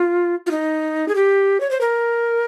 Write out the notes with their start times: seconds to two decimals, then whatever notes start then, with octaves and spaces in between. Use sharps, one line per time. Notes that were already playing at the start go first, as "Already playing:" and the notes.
Already playing: F4
0.46 F4
0.51 D#4
1.08 G#4
1.15 G4
1.61 C#5
1.71 C5
1.81 A#4